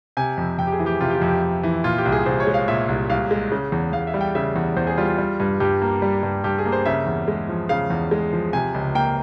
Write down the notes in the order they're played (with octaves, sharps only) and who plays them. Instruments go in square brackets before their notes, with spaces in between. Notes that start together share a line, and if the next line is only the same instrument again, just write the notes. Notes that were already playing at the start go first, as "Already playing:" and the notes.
[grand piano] C3 G#5
F2
F2 G5
G4
G#4
E3
G4
C3 F4
G4
F4
F2
G4
F2
E3
A#2 F4
G4
C2
G#4
C2 C5
C#5
G#3
F5
A#2 E5
C2
C2 F5
G#3
C#3
E2
E2 F5
E5
G3
G5
C#3 E5
E2
E2 C5
G#4
G3 F4
F4
G3
G2
G2 G4
A#3
G3
G2
G2 G4
G#4
A#3
C5
C#3 E5
E2
G#3
F3
C#3 F5
E2
G#3
F3
C3 G#5
C#2
A#3 G5